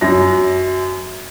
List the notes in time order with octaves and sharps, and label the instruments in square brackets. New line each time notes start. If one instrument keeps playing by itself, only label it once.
[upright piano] F#2 A#6